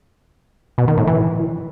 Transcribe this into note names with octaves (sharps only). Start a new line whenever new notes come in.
B2
D#3
A2
E3